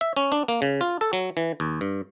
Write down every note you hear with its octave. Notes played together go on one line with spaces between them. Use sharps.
E5
C#4
D4
A#3
C#3
F4
A4
F#3
E3
D#2
G2